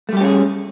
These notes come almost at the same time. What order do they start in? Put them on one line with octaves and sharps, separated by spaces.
A3 G3 G4 C#4 G#4